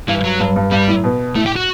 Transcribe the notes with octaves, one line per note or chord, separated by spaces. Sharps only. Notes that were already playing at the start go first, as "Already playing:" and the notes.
G2 E3
F#3
G2
G2
G2 G3
A2
B2
A2 A3
G4
F#4